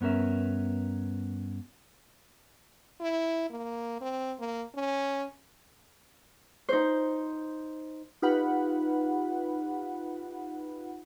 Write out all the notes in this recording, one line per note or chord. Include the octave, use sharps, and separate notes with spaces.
G2 B3 C#4 A#4 E5
E4
A#3
C4
A#3
C#4
D#4 C5
D#4 F4 G4 B4 F#5 B5